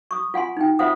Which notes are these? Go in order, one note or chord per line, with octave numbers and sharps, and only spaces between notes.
C#6 D#6
F4 F#5 G#5 C6
D#4 G5
F4 C5 E5 F#5 D#6